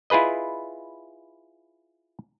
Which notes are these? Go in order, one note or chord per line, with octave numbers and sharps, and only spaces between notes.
E4 F4 G#4 B4 D#5